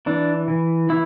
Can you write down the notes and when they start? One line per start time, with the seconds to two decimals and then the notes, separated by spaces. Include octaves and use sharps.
0.06 E3 D4
0.48 E3
0.89 E3 E4